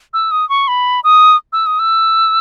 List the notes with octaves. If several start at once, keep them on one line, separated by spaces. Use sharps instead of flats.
E6
D#6
C#6
B5
D#6
E6
D#6
E6